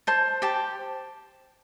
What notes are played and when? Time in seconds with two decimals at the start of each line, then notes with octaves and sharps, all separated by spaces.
0.07 C5 A5
0.42 G4 A5